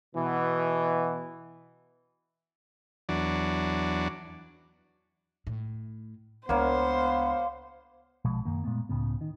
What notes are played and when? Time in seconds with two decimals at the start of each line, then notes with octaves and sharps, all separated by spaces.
0.15 B2 E3
3.09 E2 F#3 D4
5.47 A2
6.49 C#2 A#3 B3 D4 C5 C#5 F5
8.25 A#1 B2 F3 G#3
8.45 F#2 D#3 A#3
8.64 A#2 G#3 A3 B3
8.89 C#2 A2 C#3 B3
9.21 D#3